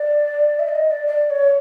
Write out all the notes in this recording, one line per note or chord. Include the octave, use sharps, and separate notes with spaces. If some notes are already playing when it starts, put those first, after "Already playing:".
Already playing: D5
E5
D5
D#5
D5
D5
C#5